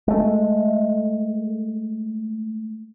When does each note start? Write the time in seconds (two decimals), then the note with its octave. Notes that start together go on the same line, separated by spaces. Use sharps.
0.08 G#3 A3